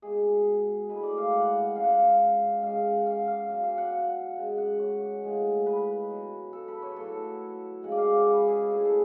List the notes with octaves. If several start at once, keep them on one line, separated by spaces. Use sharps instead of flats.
B2 G#3 G#4
A2 G#3 B4
D5
F5
F#5
C#3 F3 G#3 F5
F#5
F5
C#3 G#3 F5
F#5
F5
F5
B2 F#3
F5
F#5
C#3 G#3
F#5
C#5
A2 F3 G#3
B4
B2 F#3
A4
B4
C#5
A2 F#3 A4
C#3 F3 G#3 F#5
D5
F5
C#5
B4
G#4
A2 G#3 A4
G#4
A4